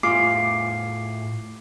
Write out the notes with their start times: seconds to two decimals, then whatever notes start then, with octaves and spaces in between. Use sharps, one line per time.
0.03 A2 F4 G#4 D6 C7